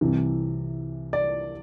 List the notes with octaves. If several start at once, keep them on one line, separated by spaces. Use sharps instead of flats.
C2 C3 E3
D5